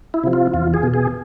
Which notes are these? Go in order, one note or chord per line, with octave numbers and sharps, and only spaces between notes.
E4
C3 F3
F4
E2 F4
G#4
B2
G#4